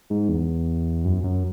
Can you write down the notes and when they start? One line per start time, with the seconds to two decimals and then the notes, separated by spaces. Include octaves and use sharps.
0.10 G#2
0.29 E2
1.05 F#2
1.24 F#2